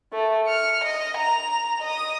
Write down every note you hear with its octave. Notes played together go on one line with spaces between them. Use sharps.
A3
F6 C#7
D#5
A#5 F7
D#5 D#6